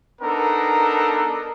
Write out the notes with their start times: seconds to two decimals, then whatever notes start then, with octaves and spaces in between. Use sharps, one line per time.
0.22 B3 D4 D#4 A4 A#4